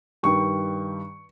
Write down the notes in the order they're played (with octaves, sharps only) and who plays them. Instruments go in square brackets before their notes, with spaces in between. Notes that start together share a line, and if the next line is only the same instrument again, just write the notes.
[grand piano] G2 D#3 G3 C#6